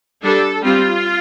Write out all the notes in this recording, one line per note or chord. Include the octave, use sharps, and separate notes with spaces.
G3 D4 A4
G3 C4 F4